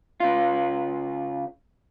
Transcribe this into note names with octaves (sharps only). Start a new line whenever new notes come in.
C#3 F4